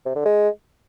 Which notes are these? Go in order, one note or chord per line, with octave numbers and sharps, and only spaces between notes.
C3
D3
G#3